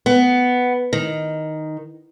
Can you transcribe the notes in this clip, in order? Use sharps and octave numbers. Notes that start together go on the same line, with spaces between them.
B3
D#3